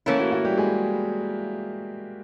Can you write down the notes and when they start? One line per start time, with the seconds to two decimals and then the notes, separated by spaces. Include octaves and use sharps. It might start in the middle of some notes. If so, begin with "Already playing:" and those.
0.06 E3 A3 A#3 C#4 E4 A#4
0.19 F#4
0.32 F#4
0.44 G3 G4
0.58 G#3 G#4